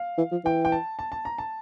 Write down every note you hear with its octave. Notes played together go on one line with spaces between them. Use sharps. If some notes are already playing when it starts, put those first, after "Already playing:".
Already playing: F5
E3
F3
E3 G5
G5
A5
A5
A5
A#5
A5